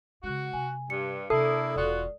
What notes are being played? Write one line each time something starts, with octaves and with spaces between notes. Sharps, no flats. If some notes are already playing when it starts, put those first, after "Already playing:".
C#3 G#3 F#4
C3 G#5
G2 C#7
C3 A#3 D4 E4 A4 D#6 C7
E1 F4 F#4 D5